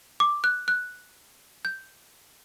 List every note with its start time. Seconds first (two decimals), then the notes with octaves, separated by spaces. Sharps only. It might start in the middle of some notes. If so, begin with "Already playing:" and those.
0.20 D6
0.44 F#6
0.68 F#6
1.65 G6